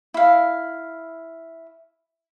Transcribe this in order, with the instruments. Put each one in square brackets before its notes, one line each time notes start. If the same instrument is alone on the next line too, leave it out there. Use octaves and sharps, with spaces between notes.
[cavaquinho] E4 F5